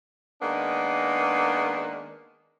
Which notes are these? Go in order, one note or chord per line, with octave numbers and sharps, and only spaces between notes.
D#3 G#3 A#3 B3 D4